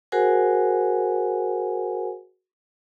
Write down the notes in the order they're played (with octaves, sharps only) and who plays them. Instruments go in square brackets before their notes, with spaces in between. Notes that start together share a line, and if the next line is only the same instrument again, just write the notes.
[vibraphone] F#4 G#4 A#4 C5 F#5 G#5